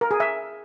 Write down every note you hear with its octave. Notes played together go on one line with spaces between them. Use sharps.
A#4
G#4
E5